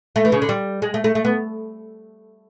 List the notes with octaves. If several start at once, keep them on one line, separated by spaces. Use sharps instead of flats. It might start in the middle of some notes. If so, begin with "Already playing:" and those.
A3
E3
C#3
D3
G3
G#3
A3
A3
A3
B3